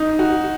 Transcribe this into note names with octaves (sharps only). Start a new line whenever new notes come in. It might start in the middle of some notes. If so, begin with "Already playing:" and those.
Already playing: D#4
F#4